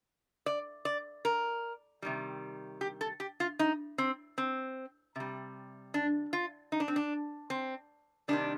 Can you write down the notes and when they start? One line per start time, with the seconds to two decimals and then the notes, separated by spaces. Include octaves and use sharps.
0.46 D5
0.85 D5
1.25 A#4
2.02 C3 D#3 G3
2.81 G4
3.01 A4
3.20 G4
3.40 F4
3.59 D#4
3.98 C4
4.38 C4
5.16 C3 G3
5.94 D4
6.33 F4
6.72 D#4
6.80 D4
6.88 C4
6.96 D4
7.50 C4
8.28 C3 D#3 G3 D4